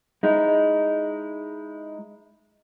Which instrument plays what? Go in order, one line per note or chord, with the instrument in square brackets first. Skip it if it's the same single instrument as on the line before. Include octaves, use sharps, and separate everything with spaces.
[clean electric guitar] G#3 D#4 E4